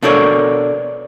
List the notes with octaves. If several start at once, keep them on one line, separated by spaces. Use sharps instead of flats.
B2 D4 A4 A#4 C#5 D5